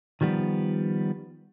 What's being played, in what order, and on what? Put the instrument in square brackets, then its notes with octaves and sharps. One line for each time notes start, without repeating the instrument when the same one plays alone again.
[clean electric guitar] D#3 F3 G3 B3